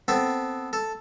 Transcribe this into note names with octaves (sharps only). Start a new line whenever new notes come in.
B3 C4 A4
A4